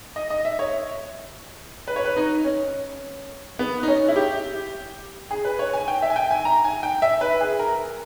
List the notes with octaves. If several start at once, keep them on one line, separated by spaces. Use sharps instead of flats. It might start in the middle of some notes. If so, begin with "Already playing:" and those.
D#5
D#5
E5
C#5
B4
C#5
B4
D#4
C#4
B3
D#4
C#4
E4
G4
G#4
B4
C#5
G#5
G5
E5
G#5
G5
G#5
A#5
G#5
G5
E5
B4
G#4
A#4